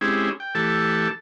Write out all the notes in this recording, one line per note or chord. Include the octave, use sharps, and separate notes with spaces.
G#3 C4 C#4 E4 G4 G#4
G5
E3 A3 G4 A4 A5